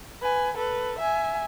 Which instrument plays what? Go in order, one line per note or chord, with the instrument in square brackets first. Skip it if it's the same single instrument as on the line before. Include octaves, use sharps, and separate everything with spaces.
[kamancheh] B4 G#5
A4 B4
E5 G#5